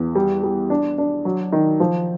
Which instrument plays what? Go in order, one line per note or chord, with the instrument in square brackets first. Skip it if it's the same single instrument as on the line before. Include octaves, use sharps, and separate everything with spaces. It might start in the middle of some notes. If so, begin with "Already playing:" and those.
Already playing: [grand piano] E2
G3
G3
D4
D4
F#3
D#3
F3